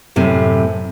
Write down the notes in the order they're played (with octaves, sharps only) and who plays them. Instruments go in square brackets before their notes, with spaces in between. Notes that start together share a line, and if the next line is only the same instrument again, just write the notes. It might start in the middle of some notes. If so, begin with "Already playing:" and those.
[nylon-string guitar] F#2 A2 C3